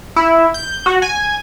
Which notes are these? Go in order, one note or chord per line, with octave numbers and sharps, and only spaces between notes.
E4
G6
F#4
G#5